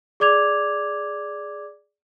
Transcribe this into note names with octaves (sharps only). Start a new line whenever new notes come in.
G#4 D5 D6 G#6 F7